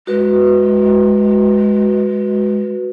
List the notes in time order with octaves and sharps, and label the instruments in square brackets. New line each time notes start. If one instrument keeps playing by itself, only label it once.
[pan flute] G#3 [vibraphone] F#4 B4